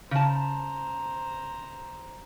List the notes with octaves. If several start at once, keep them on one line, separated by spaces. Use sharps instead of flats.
C#3 C5 A5 A#5